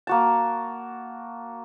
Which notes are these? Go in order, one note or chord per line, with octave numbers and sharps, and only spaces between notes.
A#3 F#4 A5